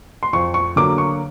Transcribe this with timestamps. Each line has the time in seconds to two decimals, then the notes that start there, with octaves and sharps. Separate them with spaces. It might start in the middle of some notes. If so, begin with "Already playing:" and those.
0.23 C6
0.33 F2 C#6
0.54 C#6
0.76 D3 F#3 A#3 D6
0.98 C#6